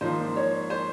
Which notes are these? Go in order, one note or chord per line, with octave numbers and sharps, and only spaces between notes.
G#2 F3 A#3 C5
C#5
C5